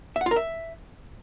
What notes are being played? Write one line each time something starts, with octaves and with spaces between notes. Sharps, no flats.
E5
F#5
F4
A#4
E5